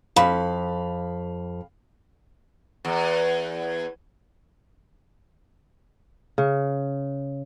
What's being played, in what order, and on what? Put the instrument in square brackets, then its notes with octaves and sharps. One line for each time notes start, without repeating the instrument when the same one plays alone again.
[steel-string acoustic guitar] F2 [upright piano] F5 B5
[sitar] E2
[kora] C#3